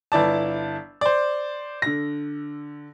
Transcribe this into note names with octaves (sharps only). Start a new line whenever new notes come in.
G1 E4 D5 A5
C5 D5
D3 A#6